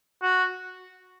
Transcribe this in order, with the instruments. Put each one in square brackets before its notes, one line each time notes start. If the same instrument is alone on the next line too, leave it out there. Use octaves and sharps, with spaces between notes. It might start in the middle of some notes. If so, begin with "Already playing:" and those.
[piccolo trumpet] F#4